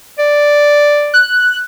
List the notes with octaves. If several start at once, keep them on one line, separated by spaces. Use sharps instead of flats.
D5
F#6